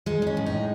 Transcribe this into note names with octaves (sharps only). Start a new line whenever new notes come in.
G#3 D#4
D#4
C#4
A2
D#4